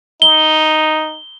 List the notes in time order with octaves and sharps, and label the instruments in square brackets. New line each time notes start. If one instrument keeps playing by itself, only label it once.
[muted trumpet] D#4 [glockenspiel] G7